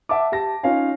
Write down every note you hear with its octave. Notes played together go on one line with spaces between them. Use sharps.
E5 F#5 A5 D6
G4 A5 A#6
C#4 D#4 F4 C#5 F5 G#5